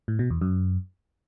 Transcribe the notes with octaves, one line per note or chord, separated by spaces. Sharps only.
A2
B2
E2
F#2